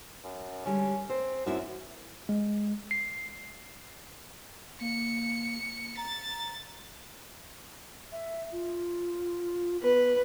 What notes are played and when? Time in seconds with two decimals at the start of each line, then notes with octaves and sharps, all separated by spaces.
0.24 F#2
0.66 D3 G3 G#3 C#4
1.10 C4 C5
1.46 F#2 C4 E4 F#4
2.29 G#3
2.91 C7
4.81 A#3 C#7
5.97 A#5 A6
8.12 E5
8.52 F4
9.83 B3 B4